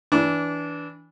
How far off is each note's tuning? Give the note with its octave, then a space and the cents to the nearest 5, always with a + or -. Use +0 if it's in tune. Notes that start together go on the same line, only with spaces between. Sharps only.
E3 -10 D4 -20 D6 -35